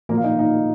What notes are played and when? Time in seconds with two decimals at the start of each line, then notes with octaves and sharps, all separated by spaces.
0.09 A#2 F3 A#3 A#4
0.17 F5
0.24 D#4 D#5
0.39 D#4 D#5